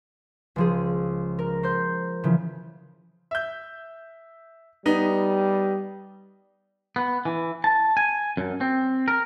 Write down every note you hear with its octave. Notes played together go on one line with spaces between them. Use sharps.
C#2 F3 G#4
A#4
C5 C6 G6
C#3 E3 F3
E5 G6
G3 B3 D#4
B3
E3
A5
G#5
F#2
C4
A#4